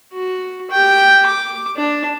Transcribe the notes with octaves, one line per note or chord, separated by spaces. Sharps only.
F#4
G4 G5
D6
D4